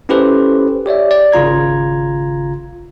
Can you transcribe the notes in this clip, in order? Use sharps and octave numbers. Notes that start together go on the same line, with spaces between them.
C#4 E4 G4 A4 B4 C5
G4 C#5 D5 E5
D5
G#1 C#3 F4 A#5 G#6